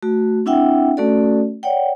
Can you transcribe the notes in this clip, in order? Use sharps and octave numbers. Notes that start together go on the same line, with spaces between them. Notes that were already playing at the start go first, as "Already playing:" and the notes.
A3 F#4
C4 D4 E4 E5 F#5 G5
A3 C#4 F#4 A4 D5
C#5 D5 F#5 G5